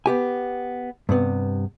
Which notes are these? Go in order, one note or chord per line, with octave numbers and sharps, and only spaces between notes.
B3 G4 G#5
G2 C3 B3